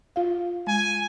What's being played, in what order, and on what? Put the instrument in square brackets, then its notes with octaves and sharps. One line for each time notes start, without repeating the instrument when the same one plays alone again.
[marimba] F4 F5
[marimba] G#3 [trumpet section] G#5